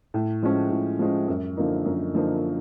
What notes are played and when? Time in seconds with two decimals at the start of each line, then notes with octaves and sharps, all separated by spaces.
0.14 A2
0.43 F3 G#3 C#4
0.71 A2
0.99 F3 G#3 C#4
1.28 F#2
1.57 D3 F3 A#3 D#4
1.85 F#2
2.14 D3 F3 A#3 D#4